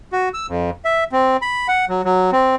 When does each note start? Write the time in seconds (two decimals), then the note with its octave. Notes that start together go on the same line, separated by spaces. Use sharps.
0.13 F#4
0.34 E6
0.48 F2
0.85 E5
1.12 C4
1.42 B5
1.68 F#5
1.89 F#3
2.05 F#3
2.32 C4